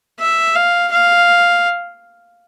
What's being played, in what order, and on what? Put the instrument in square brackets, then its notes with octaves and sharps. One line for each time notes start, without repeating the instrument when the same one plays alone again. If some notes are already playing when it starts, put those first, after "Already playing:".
[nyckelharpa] E5
F5
F5